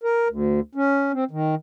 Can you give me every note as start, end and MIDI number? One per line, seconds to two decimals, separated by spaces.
0.04 0.28 70
0.29 0.60 38
0.75 1.12 61
1.13 1.24 60
1.31 1.55 51